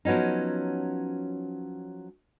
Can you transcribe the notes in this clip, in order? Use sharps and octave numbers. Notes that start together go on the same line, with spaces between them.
F3 F#3 B3 C#4 D#4